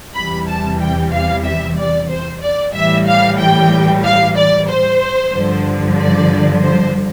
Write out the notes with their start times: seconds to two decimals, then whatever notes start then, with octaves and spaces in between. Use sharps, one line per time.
0.15 E2 C3 E3 G3 B5
0.48 A5
0.80 G5
1.12 F5
1.45 E5
1.77 D5
2.10 C5
2.41 D5
2.74 A2 E3 G3 E5
3.06 F5
3.39 G5
4.04 F5
4.37 D5
4.69 C5
5.34 G2 D3 F3
5.99 D5
6.63 C5